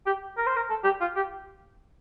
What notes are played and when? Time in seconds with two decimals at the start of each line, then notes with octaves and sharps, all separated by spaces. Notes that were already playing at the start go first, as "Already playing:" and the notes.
0.06 G4
0.38 A#4
0.47 C5
0.56 A#4
0.69 A4
0.84 G4
1.01 F4
1.16 G4